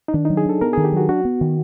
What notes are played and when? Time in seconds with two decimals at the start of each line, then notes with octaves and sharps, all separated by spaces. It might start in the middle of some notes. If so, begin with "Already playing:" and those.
0.08 D#4
0.13 D#3 D4
0.25 F#3 D#4
0.37 G#4
0.46 D4 A4
0.61 B3 A#4
0.73 D#3 G#4
0.84 G4
0.92 F#3 F#4
1.09 D4 F#4
1.25 B3
1.41 D#3